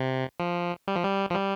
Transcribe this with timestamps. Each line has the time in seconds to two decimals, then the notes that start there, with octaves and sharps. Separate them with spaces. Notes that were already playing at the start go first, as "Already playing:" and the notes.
Already playing: C3
0.40 F3
0.88 G3
0.96 F3
1.03 G3
1.30 F3
1.34 G3